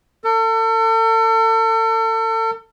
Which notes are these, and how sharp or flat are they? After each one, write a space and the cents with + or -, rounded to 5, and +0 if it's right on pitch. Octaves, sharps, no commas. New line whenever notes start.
A4 +35